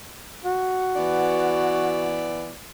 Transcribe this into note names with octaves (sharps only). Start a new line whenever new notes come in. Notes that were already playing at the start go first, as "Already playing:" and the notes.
F#4
E3 B3 D5